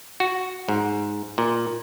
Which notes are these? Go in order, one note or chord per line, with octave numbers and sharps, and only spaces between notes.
F#4
G#2
A#2